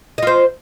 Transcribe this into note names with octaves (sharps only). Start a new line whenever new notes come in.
F4 C5 D#5